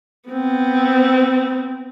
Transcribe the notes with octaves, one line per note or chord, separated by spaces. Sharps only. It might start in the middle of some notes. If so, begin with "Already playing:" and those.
B3 C4